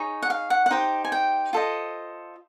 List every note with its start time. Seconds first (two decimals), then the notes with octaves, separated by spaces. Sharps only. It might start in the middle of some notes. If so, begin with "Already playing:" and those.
Already playing: D#4 G#4 C#5
0.22 F#5
0.30 F5
0.50 F#5
0.66 F#5
0.71 D#4 G4 C5 G5
1.05 G#5
1.12 G5
1.53 F4 A4 C5 D#5